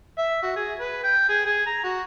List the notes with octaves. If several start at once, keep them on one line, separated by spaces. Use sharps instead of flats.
E5
F#4
G#4
B4
G5
G#4
G#4
A#5
F#4